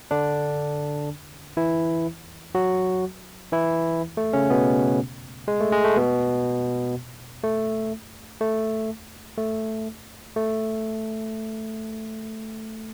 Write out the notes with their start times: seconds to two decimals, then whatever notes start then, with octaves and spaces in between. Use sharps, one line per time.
0.11 D3 D4
1.57 E3 E4
2.55 F#3 F#4
3.52 E3 E4
4.17 A3
4.33 C#3 C#4
4.50 B2 B3
5.48 G#3
5.61 A3
5.72 G#3
5.84 A3
5.97 B2 B3
7.44 A3
8.41 A3
9.38 A3
10.36 A3